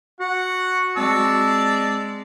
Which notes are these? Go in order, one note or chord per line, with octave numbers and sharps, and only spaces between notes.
F#4 F#5
G#3 C4 D5 A5 E6